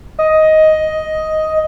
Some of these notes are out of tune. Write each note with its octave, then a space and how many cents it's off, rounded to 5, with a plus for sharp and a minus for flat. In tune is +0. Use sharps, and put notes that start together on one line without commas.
D#5 +10